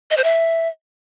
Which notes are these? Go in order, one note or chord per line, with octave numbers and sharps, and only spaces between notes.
D#5
C5
E5